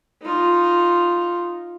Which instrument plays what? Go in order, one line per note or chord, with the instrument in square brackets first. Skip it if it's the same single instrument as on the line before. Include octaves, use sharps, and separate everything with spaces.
[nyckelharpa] D#4 F4